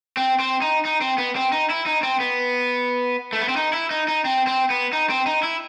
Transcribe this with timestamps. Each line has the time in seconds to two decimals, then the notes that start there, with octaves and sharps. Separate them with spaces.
0.17 C4
0.40 C4
0.62 D#4
0.85 D#4
1.01 C4
1.18 B3
1.36 C4
1.52 D#4
1.70 E4
1.86 D#4
2.03 C4
2.20 B3
3.33 A3
3.40 B3
3.49 C4
3.57 D#4
3.73 E4
3.91 D#4
4.08 D#4
4.25 C4
4.47 C4
4.70 B3
4.93 D#4
5.10 C4
5.26 D#4
5.43 E4